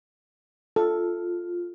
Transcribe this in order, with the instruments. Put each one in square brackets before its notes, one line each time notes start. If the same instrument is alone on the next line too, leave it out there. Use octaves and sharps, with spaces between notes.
[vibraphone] F4 [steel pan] A4